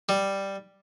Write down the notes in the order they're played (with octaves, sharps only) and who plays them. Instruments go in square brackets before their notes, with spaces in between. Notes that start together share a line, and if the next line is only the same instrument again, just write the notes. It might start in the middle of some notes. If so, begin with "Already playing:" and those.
[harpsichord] G3